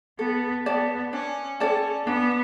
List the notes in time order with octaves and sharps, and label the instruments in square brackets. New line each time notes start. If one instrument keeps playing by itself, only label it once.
[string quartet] B3 [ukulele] A4
[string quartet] B3 [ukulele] D5 A5
[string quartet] C#4 [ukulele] D4
[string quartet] C#4 [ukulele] A4 D5 A5
[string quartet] B3 [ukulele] D4